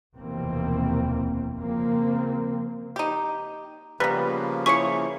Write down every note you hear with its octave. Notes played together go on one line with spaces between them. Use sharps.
F1 D#2 B2 E3 A#3 C4
C#3 F3 A#3 C4
D#4 G4
C#3 F3 G3 A#3 B3 B4 A#5
E4 G#4 C#5 C#6 C#7